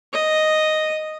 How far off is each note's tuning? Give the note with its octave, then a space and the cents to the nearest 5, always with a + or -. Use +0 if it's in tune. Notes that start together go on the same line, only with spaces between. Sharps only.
D#5 -5